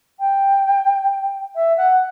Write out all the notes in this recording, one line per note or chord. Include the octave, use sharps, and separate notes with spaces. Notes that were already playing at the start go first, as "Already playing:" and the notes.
G5
E5
F#5